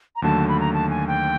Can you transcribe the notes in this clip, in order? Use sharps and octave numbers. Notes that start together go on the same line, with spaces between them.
A#5
D#2 D3 F#3 A3 A5
B5
A#5
A5
G#5
G5